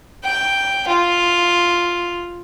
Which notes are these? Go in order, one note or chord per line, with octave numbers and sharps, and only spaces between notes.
G5
F4